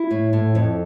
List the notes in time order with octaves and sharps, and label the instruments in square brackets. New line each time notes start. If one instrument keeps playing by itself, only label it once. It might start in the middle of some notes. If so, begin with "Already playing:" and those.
Already playing: [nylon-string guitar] E4
A2
A2
F2